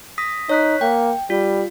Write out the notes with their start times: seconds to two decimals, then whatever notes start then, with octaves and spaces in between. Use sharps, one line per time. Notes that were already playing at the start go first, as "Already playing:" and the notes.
0.18 D#6 A#6 B6
0.49 D#4 C#5 F#6 B6
0.81 A#3 G5
1.30 G3 F4